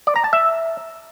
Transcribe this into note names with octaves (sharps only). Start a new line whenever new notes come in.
D5
A#5
A5
E5